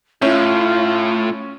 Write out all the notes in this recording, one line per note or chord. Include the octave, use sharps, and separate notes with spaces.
A2 C#4 E4 F4 C#5 E5